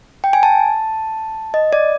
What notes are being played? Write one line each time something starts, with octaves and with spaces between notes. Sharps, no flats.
G5
G#5
A5
D#5
D5